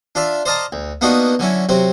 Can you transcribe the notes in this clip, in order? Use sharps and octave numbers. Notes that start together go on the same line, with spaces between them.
D4 F4 D5 E5
C5 D5 D#5 F5 A5 A#5
D2
A#3 B3 D4 D#4 F4 F#4
D3 F#3 C#4 E4
C3 F#3 C4